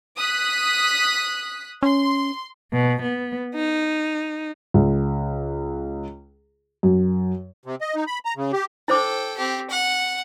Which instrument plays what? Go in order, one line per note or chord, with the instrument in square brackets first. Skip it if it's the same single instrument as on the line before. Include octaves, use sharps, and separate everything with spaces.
[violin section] D#6 F#6 B6
[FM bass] C#4 [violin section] C6
[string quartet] B2
B3
D#4
[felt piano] C#2
F#2
[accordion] C3
D#5
D#4
B5
A#5
C#3
G4
[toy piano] E4 C5 D6 [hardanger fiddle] A4 G5
[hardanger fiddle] C4 G4
F#5